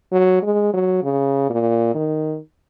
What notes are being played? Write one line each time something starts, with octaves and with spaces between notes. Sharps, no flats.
F#3
G#3
F#3
C#3
A#2
D#3